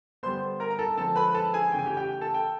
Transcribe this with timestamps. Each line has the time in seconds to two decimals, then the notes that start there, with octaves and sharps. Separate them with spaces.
0.23 D3 G3 B3 C5 C6
0.60 A#4 A#5
0.70 A#5
0.79 A4 A5
0.97 D3 F3 G#3 C4 A4 A5
1.16 B4 B5
1.34 A4 A5
1.53 G#4 G#5
1.72 C#3 E3 A3 C#4 G5
1.79 G#5
1.86 G4 G5
1.97 G4 G5
2.21 A4 A5
2.34 G5